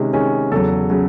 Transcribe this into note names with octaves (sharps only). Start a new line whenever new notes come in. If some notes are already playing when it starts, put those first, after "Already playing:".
Already playing: C3 D#3 G#3 C#4
C3 D#3 G#3 C#4
E2 C#3 F#3 A4
C#3 F#3